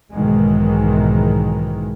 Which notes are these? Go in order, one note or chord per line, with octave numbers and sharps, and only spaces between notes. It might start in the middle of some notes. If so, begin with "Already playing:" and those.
B1 G#2 D#3 E3 G#3